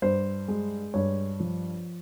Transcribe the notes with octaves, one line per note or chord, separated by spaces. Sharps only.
G2 C5
G#3
G2 C#5
F3